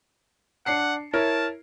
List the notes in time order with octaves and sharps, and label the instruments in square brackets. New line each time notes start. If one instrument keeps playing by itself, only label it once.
[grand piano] D4 C7 C#7 [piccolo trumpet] F#5
[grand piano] E4 A#4 C#5 [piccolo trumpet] A5